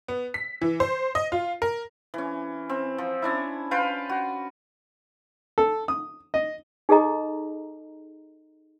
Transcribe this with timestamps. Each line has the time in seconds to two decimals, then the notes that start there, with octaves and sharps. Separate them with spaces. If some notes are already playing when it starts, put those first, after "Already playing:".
0.08 B3
0.34 B6
0.62 E3
0.80 C5
1.15 D#5
1.32 F4
1.62 A#4
2.14 E3 C#4
2.69 C4
2.98 F3
3.22 C#4 D4 E4
3.71 F4 B4 F5 G5
4.09 F#4
5.58 A4
5.88 D#6
6.34 D#5
6.89 D#4 G#4 A4 D#5 A#5